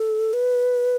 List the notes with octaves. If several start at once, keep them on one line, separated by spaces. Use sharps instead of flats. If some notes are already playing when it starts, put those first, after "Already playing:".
Already playing: A4
B4